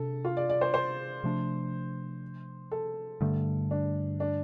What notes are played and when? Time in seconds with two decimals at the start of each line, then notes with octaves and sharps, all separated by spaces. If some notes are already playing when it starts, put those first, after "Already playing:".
Already playing: C3 D4 A4
0.25 F4
0.37 D5
0.50 D5
0.61 C5
0.74 C5
1.24 C3 F3 A3 D4
2.71 A4
3.21 G2 D3 A3
3.71 D4
4.20 D4